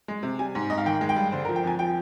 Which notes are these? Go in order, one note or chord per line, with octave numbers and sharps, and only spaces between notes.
G#3
C3
G3 G#5
G#2
G#2 D#5
F5
D#3 G5
G#3
G5
G2
D3 C5
A#4
F3
G5
F2 G#5
F3 G5